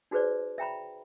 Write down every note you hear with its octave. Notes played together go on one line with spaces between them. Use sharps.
D#4 F#4 G#4 B4 C5 D5
E5 G5 A#5 B5